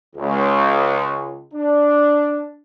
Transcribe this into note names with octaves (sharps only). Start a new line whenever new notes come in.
C#2
D4